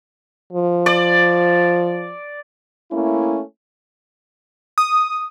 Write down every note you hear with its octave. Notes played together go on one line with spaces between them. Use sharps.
F3
D5
A3 A#3 C#4 E4
D#6